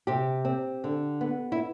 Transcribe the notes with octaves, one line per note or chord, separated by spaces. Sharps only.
C3 G4
C4
D3
B3
E4